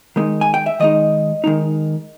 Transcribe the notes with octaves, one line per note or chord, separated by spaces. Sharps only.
D#3 G#3 D#4
G#5
G5
E5
D#3 G#3 D#4 D#5
D#3 G#3 D#4